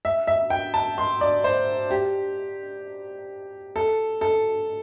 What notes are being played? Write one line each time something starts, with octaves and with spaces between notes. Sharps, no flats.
E5
E5
G5
A5
C6
D5
C5
G4
A4
A4